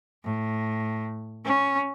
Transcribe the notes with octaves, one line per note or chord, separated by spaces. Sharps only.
A2
C#4